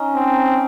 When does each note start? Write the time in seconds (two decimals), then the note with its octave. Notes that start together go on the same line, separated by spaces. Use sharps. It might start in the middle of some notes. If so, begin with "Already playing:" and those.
Already playing: C#4 D#4
0.15 C4